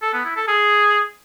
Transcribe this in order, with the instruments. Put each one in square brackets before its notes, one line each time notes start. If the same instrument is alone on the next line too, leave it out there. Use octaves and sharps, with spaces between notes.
[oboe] A4
B3
E4
A4
G#4